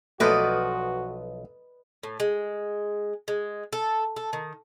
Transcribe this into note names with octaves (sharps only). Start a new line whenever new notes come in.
B1 F3 A3 B3 F#4 B4 D5 D#5
A2
G#3
G#3
A4
A4
D#3